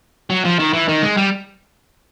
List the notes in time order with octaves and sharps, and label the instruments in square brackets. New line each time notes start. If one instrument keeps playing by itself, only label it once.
[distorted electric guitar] F#3
F3
D#3
E3
D#3
G#3
G3